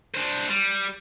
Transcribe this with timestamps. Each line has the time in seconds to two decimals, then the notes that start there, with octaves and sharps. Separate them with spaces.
0.15 D4 C5
0.50 G3